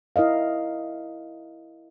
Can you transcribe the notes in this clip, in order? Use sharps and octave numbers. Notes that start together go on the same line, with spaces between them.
E4 A#4 D#5 F5